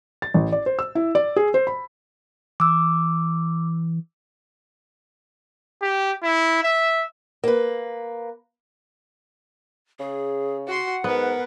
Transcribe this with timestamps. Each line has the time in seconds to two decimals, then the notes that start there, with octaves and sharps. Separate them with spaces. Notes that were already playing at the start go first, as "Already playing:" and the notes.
0.22 A6
0.34 A1
0.52 D5
0.66 C5
0.79 E6
0.95 E4
1.15 D5
1.36 G#4
1.54 C5
1.67 B5
2.60 E3 D6 E6
5.82 G4
6.23 E4
6.63 E5
7.44 A#3 B4
10.00 C#3 G#4
10.67 F#4 F#5 C6
11.04 G#2 B3 A#4 B4